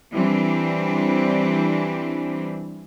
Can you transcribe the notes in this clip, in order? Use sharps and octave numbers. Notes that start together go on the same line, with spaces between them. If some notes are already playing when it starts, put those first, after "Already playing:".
E3 G3 C4 D4